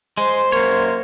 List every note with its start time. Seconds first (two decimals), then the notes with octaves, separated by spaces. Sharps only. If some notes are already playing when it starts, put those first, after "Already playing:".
0.17 G#3 C5 C6
0.52 F#2 A#3 C#5